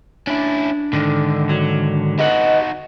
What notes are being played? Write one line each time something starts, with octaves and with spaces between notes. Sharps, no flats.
C#4 D4 E4
G#2 D3 D#3
F#3
D#4 F#4 G4 B4 D#5 F#5